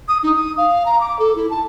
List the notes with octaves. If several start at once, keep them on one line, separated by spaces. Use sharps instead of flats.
D#6
D#4
D#6
F5
A#5
D6
A4
E4
A5